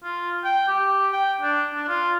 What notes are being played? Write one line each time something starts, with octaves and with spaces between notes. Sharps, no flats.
F4
G5
G4
G5
D4
D4
F4